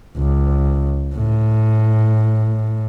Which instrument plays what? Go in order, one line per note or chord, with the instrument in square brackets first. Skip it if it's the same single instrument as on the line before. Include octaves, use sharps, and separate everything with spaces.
[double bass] C#2
A2